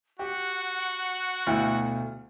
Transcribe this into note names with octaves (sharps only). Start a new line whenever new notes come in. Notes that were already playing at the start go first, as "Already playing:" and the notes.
F#4 G4 F#5
D2 B2 A3 E4 F4 G5